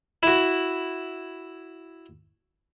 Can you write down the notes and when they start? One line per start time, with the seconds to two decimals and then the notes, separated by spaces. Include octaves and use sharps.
0.23 E4 F#4